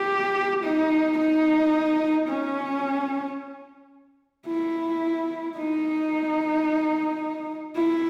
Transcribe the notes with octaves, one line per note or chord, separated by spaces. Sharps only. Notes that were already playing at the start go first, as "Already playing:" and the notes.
Already playing: G4
D#4
D#4
C#4
E4
D#4
E4